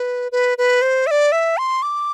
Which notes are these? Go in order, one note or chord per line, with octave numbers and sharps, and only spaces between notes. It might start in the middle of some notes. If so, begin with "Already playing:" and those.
Already playing: B4
B4
B4
C5
E5
D5
E5
C6
D6